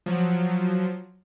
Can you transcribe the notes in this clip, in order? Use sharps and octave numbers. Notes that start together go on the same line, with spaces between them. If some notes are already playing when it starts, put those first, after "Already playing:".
F3 F#3